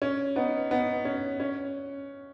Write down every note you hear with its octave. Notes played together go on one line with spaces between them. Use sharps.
C#4
B3 D#4
B3 D#4
C#4
C#4